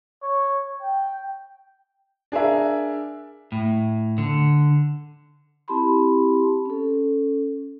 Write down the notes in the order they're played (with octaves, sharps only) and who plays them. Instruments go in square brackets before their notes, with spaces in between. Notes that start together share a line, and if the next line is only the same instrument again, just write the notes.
[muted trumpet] C#5
G5
[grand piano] D4 G#4 A#4 E5
[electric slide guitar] A2
D3
[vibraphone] C4 E4 G4 A5 B5 C6
C#4 A4